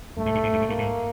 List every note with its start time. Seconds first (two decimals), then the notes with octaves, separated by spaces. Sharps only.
0.17 G2 A3
0.26 G#2
0.35 G2
0.43 G#2
0.53 G2
0.61 G#2
0.69 G2 A#3
0.78 G#2